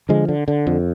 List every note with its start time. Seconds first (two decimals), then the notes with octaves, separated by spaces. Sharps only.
0.09 D3 F3 G#3
0.28 D3
0.48 D3
0.67 F2